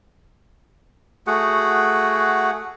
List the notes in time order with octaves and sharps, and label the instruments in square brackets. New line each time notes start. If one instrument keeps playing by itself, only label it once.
[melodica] A3 F#4 G#4 F#5